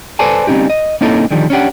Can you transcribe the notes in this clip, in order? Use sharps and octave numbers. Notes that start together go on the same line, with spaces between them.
A4 B4 C5 D5 G#5 A5
G3 C4 C#4 D#4 G4
D#5
A#3 C4 C#4 D#4 E4 A4
D3 D#3 F3 G3
C#4 D4 G4 F#5